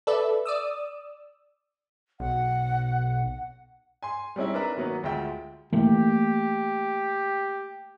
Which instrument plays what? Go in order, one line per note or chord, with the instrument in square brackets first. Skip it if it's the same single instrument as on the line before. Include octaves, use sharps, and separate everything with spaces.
[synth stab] A4 B4 D5 E5
D5 D#6 E6
[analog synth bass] B1 [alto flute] F#5
[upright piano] G#5 C6
G3 G#3 C4 C#4 D#4 E4
D4 D#4 A#4 B4 E5 A#5
D#3 F#3 A#3 B3 C#4
D2 G#3 F4 E5 G5
[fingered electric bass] E3 A3 A#3 [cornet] G4